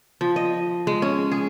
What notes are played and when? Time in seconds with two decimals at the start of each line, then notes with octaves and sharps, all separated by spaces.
0.21 F3
0.36 D#5
0.87 G#3
1.02 C#4
1.32 G#4